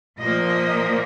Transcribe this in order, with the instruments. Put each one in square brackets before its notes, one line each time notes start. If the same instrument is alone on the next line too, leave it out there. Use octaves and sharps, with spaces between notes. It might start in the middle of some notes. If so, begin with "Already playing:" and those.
[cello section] A#2 F3 A#3 D#5